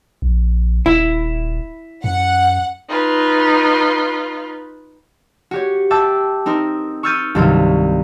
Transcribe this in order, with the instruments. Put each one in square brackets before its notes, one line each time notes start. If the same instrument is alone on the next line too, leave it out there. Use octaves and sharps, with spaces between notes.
[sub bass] A#1
[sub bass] D#1 [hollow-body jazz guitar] E4
[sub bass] F#2 [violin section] F#5
[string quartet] D#4 F4 B4
[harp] F#4 G4 C#5
E5 G5 A5 D6 E6
C4 D#4 A#4
C#6 E6 F6 G6 A6 D#7
C2 G2 D#3 F#3 C4 F5